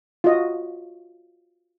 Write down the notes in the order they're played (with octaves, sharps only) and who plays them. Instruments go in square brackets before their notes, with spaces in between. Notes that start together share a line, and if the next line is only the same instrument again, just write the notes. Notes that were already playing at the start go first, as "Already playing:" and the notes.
[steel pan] F4 F#4 D#5